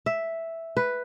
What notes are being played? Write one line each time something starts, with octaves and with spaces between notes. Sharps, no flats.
E5
B4